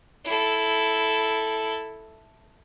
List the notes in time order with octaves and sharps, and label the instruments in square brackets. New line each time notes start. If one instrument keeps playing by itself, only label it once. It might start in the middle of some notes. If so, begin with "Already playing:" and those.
[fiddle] E4 A4